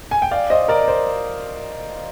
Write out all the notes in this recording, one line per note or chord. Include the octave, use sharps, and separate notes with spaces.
G#5
G5
D5 F5
C5 D#5
A#4 D5
C5